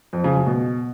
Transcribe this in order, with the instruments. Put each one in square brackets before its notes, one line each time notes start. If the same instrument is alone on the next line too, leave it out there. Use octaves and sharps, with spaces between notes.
[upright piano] F2
C#3
F#2
B2